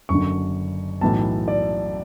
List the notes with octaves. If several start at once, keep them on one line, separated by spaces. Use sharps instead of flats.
F#1 F#2 D3 C#6
B1 A2 E3 A5
D5